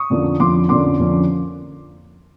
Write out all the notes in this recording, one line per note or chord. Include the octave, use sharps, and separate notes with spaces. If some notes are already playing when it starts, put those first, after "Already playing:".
Already playing: C#6 D#6
F2 D3 F3 A#3 C#4
F2 D3 F3 A#3 C#4 C6 D6
F2 D3 F3 A#3 C#4 C6 D6
F2 D3 F3 A#3 C#4